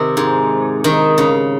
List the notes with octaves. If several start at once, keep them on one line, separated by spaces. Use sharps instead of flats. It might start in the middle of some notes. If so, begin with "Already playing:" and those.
Already playing: C3 D#3
G#2
D#3
C#3